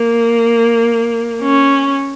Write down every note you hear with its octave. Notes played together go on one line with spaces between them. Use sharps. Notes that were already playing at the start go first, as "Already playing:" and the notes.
Already playing: A#3
C#4